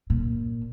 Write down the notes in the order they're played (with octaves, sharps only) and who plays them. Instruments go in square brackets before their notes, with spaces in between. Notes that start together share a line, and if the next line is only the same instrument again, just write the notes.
[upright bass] A#2